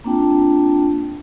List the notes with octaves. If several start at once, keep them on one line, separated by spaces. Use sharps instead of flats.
A#3 C4 D4 F4 G5 A5